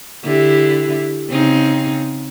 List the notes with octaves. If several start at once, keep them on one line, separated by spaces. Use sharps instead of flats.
D3 E4 G4
C#3 C4 D#4